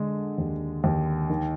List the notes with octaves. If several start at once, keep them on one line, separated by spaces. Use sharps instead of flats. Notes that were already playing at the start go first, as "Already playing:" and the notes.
Already playing: D3 G#3
D#2
D#2
D#3